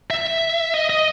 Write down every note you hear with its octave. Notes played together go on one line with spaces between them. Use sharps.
E5
D#5
D#5